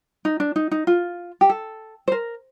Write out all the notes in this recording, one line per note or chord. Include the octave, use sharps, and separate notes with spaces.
D#4
D4
D#4
D#4
F4
G4
A4
C5
A#4